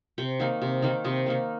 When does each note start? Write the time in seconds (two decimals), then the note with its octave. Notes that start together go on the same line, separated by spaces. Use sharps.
0.18 C3 G5
0.40 D#3 A#3 D#4
0.62 C3
0.82 D#3 A#3 D#4
1.04 C3 D#5
1.26 D#3 A#3 D#4